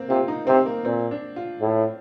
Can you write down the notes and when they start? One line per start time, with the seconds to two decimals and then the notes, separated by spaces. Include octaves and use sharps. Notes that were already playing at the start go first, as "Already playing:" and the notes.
Already playing: A#3 C4
0.09 C3 F4
0.28 D#4
0.47 C3 C4
0.66 A#3
0.85 A#2 C4
1.11 D4
1.36 F4
1.61 A2